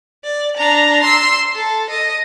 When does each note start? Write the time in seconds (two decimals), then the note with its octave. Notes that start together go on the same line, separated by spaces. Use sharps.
0.24 D5
0.57 D4 A#5
1.03 C6 E6
1.55 A4
1.90 D#5